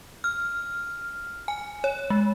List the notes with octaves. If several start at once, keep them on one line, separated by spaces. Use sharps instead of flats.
F6
G#5
C#5
G#3